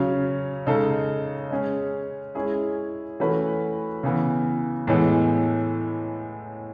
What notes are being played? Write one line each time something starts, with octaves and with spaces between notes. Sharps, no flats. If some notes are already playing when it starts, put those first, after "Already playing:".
Already playing: C#3 F#3 C#4
C#3 G#3 D#4 A4
G#3 C#4 G#4
G#3 C#4 E4 G#4
E3 A3 C#4 F#4 B4
C#3 E3 B3
A2 E3 G#3 B3